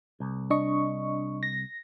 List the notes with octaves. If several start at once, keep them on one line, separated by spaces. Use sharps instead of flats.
C2
D4 D#5 C#6
A#6